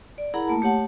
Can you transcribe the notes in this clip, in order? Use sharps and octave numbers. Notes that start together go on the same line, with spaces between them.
D5
E4 G#4 A#4 F#5 A#5 B5
A3 A#3 A5
A3 G4 C#5 F#5 A5